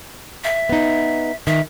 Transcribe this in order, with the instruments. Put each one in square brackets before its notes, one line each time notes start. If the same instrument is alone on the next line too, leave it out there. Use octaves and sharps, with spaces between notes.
[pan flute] E5
[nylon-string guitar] B3 D#4
[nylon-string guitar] D#3 [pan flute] E5